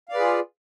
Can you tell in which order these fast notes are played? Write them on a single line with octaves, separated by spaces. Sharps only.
F5 D5 B4 G#4 F4